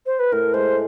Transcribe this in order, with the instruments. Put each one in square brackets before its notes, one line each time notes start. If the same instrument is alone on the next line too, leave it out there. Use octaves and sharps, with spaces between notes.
[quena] C5
B4
[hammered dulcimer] A2 [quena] A#4
[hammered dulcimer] G#3 [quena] C5